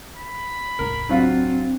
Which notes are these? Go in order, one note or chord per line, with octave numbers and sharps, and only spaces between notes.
B5
E1 C#2 A2 A#4
F#3 C4 D4 F4